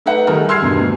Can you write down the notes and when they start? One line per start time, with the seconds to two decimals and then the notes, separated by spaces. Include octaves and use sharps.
0.06 A3 D#4 B4 E5 F#5
0.27 D#3 G3 A3 D#4 G#4 A#4
0.49 C6 E6 F6 G#6 C7
0.62 E2 G2 B2
0.77 D2